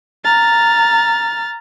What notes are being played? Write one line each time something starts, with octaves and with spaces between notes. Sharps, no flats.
A#5 F6 A6